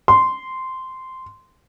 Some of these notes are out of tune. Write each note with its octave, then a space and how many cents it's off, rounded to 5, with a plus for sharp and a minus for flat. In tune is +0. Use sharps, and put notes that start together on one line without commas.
C6 -10